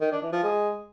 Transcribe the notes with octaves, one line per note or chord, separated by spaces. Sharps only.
D#3
D4
E3
F3
G#3